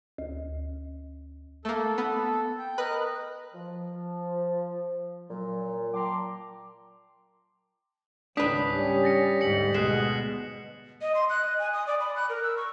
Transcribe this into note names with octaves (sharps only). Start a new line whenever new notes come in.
D2
A3 A#3 A4
B3
G5
A#4 B4 D#5 F#6
F3
A#2 F#3
G5 A5 A#5 C6 D6
G#1 C#2 D4 B4 D#6 G6 B6
G3 C#4
A6 A#6 C#7
D2 G#2 B6 C#7 F#7
B2 G#3 F#6 C7 E7
D#5
C6
F#6
D#5
G#5
D#6
D5
B5
F#6
A#4
E6
C#6